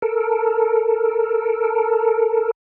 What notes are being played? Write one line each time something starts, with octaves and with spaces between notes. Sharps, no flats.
A4 A#4